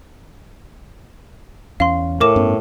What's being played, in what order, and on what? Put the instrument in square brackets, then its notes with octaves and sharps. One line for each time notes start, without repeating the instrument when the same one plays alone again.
[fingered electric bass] E2 C#4 [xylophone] F5 C6
[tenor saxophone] A2 [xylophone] A#4 D6 E7
[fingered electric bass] G2 B3 C#4